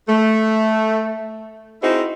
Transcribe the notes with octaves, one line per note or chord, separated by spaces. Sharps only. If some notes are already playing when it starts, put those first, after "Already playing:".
A3
C4 D#4 E4 F#4 G#4 C5